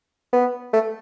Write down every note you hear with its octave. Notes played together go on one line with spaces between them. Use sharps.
B3
A3